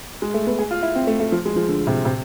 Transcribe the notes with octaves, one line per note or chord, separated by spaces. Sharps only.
G#3
A3
B3
G#4
F4
E4
C4
A3
A3
F3
G#3
F3
D3
C3
C3